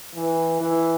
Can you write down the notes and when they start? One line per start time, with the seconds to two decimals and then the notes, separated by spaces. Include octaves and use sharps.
0.15 E3
0.61 E3